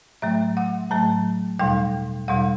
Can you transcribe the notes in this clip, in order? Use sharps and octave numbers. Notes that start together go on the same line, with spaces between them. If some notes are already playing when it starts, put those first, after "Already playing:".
A2 F#3 A3 E5
F#5
A2 F#3 A3 A5
E2 B2 G3 G5
E2 B2 G3 F#5